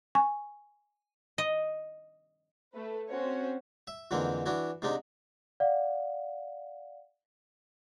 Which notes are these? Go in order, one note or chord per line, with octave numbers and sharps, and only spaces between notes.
G#5 C#6
D#5
A3 B4
C4 C#4 F#4 C5 C#5
E5
F2 G#2 D3 E3 A#3 C4
E3 D4 E4 F#4
G#2 C3 G#3 D4 D#4
D5 F5 F#5